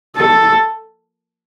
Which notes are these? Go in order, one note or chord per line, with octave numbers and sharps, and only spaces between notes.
A4